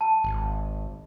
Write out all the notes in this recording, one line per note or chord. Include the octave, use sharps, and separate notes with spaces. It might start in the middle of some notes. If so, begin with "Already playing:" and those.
A5
G#1